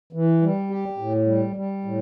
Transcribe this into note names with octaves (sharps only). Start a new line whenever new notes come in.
E3
G3
G4
A2
G3
G3
A2